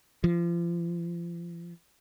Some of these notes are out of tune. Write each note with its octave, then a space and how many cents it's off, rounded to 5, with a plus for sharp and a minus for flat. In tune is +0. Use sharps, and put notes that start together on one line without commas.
F3 -35